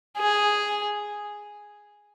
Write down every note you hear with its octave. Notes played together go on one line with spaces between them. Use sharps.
G#4